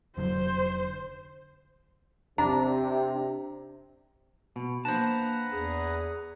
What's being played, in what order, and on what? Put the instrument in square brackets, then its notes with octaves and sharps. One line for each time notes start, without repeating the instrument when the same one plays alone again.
[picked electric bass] F1 D3 F#3 [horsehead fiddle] C5
[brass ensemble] C3 [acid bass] D4 [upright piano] A#5
[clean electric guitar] B2
[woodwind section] A#3 D4 [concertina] B4 F#5 A#5 [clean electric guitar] C5 A5
[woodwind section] E2 G#4